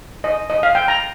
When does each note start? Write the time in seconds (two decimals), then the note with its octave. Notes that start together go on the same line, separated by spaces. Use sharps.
0.24 D#5
0.50 D#5
0.63 F5
0.75 G5
0.88 A#5